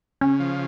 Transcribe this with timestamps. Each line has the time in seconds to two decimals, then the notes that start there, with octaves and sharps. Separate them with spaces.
0.21 C#3 C#4
0.40 F3